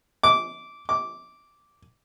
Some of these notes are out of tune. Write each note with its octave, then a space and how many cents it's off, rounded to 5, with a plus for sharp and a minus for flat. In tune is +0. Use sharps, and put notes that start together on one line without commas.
D6 -15
D6 -10